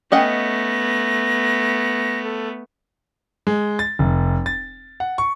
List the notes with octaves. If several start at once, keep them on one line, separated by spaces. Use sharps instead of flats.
A3 B3 C#4 D#5 F#5 A#6
A4
G#3
A6
F1
A6
F#5
C#6